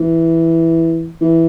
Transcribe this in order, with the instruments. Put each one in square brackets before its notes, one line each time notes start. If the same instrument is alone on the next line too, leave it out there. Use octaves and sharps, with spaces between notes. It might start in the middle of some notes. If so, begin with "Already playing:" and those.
Already playing: [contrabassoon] E3
E3